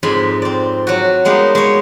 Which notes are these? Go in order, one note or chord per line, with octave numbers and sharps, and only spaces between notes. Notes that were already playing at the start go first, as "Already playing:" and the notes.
F2 G#2 G#3 G#5 B5
C4 D5
F#3 F#4
G3 G#3 A#3 B3 D#4
G#3 C#5